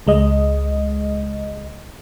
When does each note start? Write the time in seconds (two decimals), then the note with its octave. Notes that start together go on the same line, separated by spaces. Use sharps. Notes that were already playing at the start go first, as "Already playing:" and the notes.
0.07 C#2 G#3 D#5